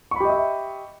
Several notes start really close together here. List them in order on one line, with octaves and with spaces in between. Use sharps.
C#6 B5 G4 D#5 E5